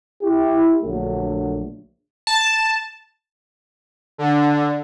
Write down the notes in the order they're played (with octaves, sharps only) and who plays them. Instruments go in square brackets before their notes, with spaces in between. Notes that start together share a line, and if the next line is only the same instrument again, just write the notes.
[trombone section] E4 G4
A#1 D3 F#3 A3
[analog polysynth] A5
[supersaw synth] D3